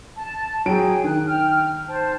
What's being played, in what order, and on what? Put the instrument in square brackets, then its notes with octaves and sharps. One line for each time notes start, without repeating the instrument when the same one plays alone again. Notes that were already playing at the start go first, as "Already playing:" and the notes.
[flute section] A5
[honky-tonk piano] F#3 D7 [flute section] G#4 G5
[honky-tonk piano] D#3 [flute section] F#6
[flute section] G5 F6
C5 A5